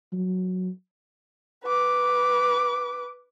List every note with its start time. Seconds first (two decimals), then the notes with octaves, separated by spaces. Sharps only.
0.13 F#3
1.64 B4 D6